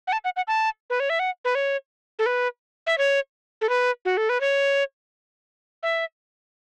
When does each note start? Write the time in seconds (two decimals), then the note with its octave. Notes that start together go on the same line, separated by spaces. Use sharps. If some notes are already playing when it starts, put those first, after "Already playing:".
0.07 F#5
0.13 A5
0.25 F#5
0.36 F#5
0.48 A5
0.90 B4
1.00 C#5
1.10 E5
1.19 F#5
1.45 B4
1.55 C#5
2.19 A4
2.26 B4
2.87 E5
2.98 C#5
3.61 A4
3.69 B4
4.05 F#4
4.17 A4
4.29 B4
4.41 C#5
5.83 E5